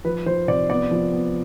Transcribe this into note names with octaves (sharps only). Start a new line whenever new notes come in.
F3 B4
F3 C5
C3 D5
B3 D5
F3
B3